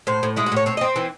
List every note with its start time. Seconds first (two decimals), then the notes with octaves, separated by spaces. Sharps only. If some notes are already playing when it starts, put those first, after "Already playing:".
0.07 A2 C5
0.23 A2
0.36 G#3 E4
0.46 F#4
0.52 A2 C#5
0.66 C4 C#5
0.77 D#5
0.81 C4
0.96 E3